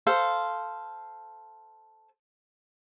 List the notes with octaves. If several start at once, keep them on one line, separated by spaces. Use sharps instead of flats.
A4 C5 F5